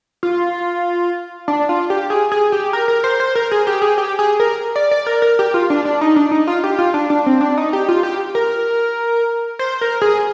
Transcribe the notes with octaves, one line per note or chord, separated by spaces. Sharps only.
F4
D4
F4
G4
G#4
G#4
G4
A#4
A#4
C5
C5
A#4
G#4
G4
G#4
G4
G#4
A#4
D5
D5
A#4
A#4
G4
F4
D4
D4
D#4
D4
D#4
F4
G4
F4
D4
D4
C4
D4
D#4
G4
F4
G4
A#4
C5
A#4
G#4